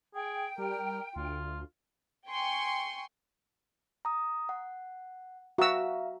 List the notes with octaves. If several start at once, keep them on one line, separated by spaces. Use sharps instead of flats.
G#4 G5
G3 A#4
D2 F4
G5 G#5 C6 C#6
A#5 D#6
F#5
F#4 E5 F5 A#5 E6